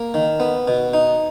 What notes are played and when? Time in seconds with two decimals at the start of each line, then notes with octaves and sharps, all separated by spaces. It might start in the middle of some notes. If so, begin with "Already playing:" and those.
Already playing: A#3
0.14 D#3
0.40 B3
0.68 B2
0.93 D#4